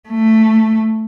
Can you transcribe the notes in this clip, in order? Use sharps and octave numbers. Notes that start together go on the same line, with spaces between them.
A3